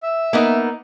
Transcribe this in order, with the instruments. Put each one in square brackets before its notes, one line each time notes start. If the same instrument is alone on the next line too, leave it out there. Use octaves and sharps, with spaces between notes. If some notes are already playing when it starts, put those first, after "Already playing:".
[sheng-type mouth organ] E5
[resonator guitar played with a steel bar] A#3 B3 D#4